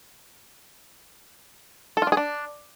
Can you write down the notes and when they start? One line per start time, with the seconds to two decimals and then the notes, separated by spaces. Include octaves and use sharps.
1.97 A4
2.02 F4
2.07 D4
2.12 G#4
2.17 D4